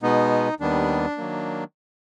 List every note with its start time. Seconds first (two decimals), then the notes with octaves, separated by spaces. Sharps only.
0.03 B2 G#3 B3 D#4
0.60 D#2 D#3 G3 B3 D4
1.18 D#3 F#3 A#3